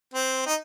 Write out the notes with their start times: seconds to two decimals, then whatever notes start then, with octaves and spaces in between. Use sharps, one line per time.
0.14 C4
0.46 D#4